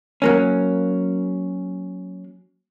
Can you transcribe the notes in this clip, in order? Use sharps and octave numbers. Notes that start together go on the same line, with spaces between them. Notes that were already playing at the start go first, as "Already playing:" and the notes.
F#3 A#3 C#4